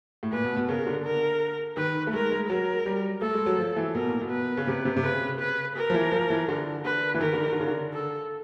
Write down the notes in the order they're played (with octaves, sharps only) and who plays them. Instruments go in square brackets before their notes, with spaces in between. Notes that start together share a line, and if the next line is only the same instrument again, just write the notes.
[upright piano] A2
[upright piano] A#2 [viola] B4
[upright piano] B2
B2
[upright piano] C#3 [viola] A#4
[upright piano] D3
[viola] A#4
[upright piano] D#3 [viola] B4
[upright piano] A3
[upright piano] G#3 [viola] A#4
[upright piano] G#3
[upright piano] F#3 [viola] A#4
[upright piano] G3
[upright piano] A3 [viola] A4
[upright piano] G#3
F#3
F3
E3
[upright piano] B2 [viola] A#4
[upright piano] A#2
B2
[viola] B4
[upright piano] C#3
C3
C3
C3
[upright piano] C#3 [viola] B4
[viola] B4
A#4
[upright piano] F3
E3
F3
E3
D3
[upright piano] D3 [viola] B4
[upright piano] E3
[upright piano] D#3 [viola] A#4
[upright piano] D3
D#3
D3
C#3
D3
[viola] A4